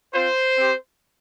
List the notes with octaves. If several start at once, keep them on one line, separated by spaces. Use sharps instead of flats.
C4 F4 C5
C4 G4